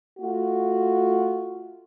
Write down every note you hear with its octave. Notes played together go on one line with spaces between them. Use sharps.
A3 F4 F#4